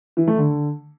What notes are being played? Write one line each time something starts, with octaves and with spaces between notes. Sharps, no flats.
E3
A3
D3